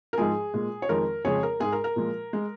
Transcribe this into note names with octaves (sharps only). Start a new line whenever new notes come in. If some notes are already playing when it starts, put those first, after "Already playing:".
A#4
G#2 F3 G#3 G#4
A#2 G#3
C#5
F2 D#3 G#3 A#4
F2 C#3 F3 G#3 G#4 C#5
A#4
G#2 G#3 G#4
A#4
A#4
A#2 F3 G#3
G#3